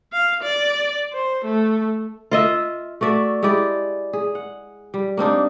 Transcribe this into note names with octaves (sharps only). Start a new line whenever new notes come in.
F5
D5
C5
A3
F4 D#5 E5
A3 F#4 D5 E5
G#3 E4 G4 D5
G#4
F#5
G3
A#3 C4 D4 D#4